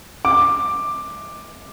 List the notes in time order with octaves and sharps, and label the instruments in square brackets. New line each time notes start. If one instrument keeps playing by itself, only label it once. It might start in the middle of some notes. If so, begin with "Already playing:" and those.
[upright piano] D6